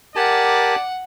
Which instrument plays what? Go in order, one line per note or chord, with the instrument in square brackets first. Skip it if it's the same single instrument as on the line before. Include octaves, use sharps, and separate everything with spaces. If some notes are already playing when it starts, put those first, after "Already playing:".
[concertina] G4 G#5 A5 [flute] A#4 [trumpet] D5 [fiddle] F#5